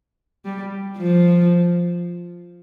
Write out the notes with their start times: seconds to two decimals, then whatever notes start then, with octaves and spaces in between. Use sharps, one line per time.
0.45 G3
0.97 F3